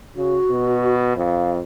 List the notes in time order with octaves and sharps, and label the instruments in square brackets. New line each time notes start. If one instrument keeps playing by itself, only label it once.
[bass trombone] C#3 [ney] F#4
[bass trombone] B2
[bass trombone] F2 [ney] F5